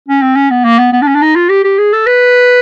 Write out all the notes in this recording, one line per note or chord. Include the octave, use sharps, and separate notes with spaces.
C#4
C4
C#4
B3
A#3
B3
B3
D4
C#4
D4
D#4
F4
G4
G4
G#4
A4
B4